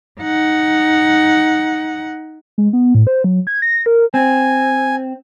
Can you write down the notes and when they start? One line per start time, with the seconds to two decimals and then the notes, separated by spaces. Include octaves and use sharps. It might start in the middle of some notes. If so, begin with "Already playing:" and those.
0.20 D#4 F#5
2.58 G#3
2.73 B3
2.95 A2
3.07 C5
3.24 F#3
3.47 G#6
3.62 A#6
3.86 A#4
4.14 C4 G#5